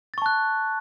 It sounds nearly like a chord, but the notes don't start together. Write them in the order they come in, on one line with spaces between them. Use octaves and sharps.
A6 C#6 A5 F#6